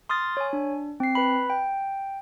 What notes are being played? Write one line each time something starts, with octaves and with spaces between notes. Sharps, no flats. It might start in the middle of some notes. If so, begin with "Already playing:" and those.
C6 D#6 F6 A6
C#5 G#5
D4
C4 C7
B4 B5
G5